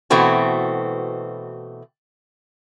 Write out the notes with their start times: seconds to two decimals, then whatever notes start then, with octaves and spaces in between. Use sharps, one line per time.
0.10 B2 E3 A3 C4 F#4